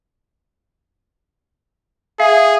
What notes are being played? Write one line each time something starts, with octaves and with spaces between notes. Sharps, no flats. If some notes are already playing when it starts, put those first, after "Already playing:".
G#4 E5 F5